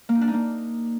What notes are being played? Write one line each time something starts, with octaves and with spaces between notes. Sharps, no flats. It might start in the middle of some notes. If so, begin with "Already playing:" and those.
A#3
D#4
D4
D#4
A#3